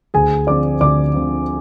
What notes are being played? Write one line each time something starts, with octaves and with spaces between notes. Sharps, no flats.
D2 G#4 G#5
D3 F3 C4 F4 D5 D6
D2 D5 D6
D3 F3 C4 F4